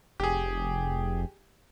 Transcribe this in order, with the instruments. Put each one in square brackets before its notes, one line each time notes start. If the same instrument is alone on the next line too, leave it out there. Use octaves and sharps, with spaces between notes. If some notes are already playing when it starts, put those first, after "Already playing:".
[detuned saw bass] F1 [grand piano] G4 G#4